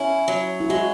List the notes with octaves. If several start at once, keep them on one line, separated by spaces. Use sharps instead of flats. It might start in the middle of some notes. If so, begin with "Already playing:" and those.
Already playing: C#4 E4
F#3
E4
G#3 F#4